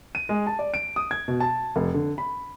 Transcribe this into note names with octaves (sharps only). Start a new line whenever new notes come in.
D#7
G#3
A5
D5
D7
D#6
G#6
B2
A5
F1
D3
B5